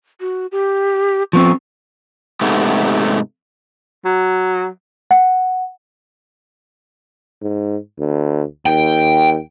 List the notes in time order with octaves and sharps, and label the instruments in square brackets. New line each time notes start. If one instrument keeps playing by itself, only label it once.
[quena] F#4
G4
[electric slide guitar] F3 B3 C4 [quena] C#6
[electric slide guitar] G#2 C3 A3 B3
[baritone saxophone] F#3
[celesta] F#5
[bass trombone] G#2
D2
[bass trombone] D#2 [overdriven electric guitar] G5